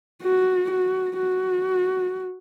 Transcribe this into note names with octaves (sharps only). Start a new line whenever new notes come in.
F#4
F#4
F#4